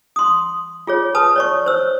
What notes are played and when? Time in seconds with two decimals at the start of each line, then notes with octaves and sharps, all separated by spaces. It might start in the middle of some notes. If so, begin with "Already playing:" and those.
0.16 C6 D#6
0.87 F4 G#4 C#5
1.15 B4 A5 D#6
1.36 C#5 D5 C#6
1.66 C5 C#5 E6